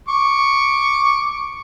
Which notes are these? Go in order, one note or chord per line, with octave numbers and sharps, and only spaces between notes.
C#6 D6